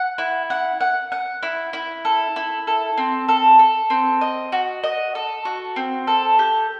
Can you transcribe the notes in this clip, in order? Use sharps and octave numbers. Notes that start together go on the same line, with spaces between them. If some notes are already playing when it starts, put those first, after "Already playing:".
Already playing: F#5
E4
F#5
F#5
F#5
E4
E4
A4
E4
A4
C4
A4
A4
C4
D#5
F#4
D#5
A4
F#4
C4
A4
G4